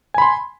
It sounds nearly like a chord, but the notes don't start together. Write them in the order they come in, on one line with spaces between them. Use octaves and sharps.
G#5 B5 C6